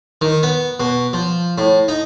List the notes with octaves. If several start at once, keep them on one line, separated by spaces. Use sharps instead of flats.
D#3
B3
B2
F3
A2
D#4